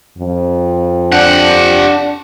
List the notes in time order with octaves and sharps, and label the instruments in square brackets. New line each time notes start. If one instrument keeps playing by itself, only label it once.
[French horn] F2
[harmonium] D4 [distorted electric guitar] G4 F#5